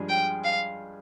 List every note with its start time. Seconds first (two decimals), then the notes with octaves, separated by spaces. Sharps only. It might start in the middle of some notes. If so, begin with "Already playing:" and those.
Already playing: G2 F3 G#3 D4 G#4
0.09 G5
0.44 F5